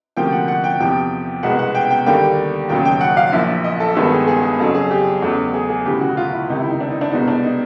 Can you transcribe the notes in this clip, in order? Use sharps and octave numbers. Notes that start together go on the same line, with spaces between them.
D2 C3 F3 A#3 G5
F#5
F#5
G5
E2 C3 F3 G5
C2 B2 G#3 B3 F#5
F#5
G5
G5
D#2 D3 G3 A#3 G5
E1 D#2 C#3 F#3 G5
G5
F#5
F5
A#1 A#2 F3 E5
D#5
A4
G#1 G2 D#3 G#3 B3 A4
G#4
G#4
G#4
F2 C#3 F#3 A4
G#4
G4
E2 C#3 F#3 A3
G#4
G#4
E1 D2 C#3 E3 G4
F#4
F4
E4
C#2 C3 D#3 D#4
E4
D#4
D4
D#4
D4
C2 B2 G#3 B3 D#4
D4
D#4